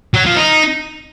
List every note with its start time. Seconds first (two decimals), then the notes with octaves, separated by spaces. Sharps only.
0.14 F#3
0.25 F3
0.37 D#4